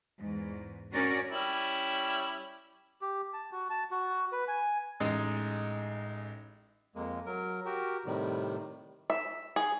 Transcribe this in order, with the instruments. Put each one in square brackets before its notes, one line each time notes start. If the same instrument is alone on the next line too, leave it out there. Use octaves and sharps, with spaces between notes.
[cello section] E2 G#2
C#4 D4 F#4 A#4 C#5 D5
[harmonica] G3 C#4 E4
[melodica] G4
A5
F#4
A5
F#4
B4
G#5
[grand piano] A1 G#3 D#4
[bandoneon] F2 G#3 A#3
F#3 A#4
F#4 G4 A#4
A2 C3 D#3 G3
[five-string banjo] E5
G#4